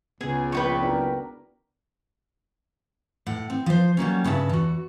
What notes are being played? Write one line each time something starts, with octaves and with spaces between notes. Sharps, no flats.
C#2 C#3 B3 G#4
A#1 B4 G5 C#6
F#1 B3 D4 A#4
A2 F#5
C4
F3 C5
F#3 G3 A#3 C#4
G2 C#3 E5 A5
E2 F#4